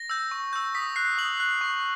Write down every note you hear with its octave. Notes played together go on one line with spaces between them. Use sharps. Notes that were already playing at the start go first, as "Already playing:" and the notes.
Already playing: A#6
E6 G6
C#6
E6 G6
D#6 B6
F#6 C7
D#6 F#7
F#6
C#6